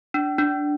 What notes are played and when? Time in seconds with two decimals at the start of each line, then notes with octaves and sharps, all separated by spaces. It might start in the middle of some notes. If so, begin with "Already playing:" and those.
0.14 D4
0.38 D4